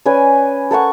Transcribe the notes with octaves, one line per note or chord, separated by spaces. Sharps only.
C#4 B4 D5 G#5
A4 A#4 F#5 C#6